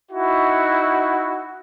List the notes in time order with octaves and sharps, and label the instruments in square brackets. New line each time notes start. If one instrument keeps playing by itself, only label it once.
[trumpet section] D#4 E4 F#4